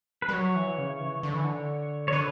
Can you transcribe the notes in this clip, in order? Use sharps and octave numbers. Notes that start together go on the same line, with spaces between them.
B4
G3
F#3 C#5
E3
C#3
E3
D3
E3
D3
C#5
D3 B4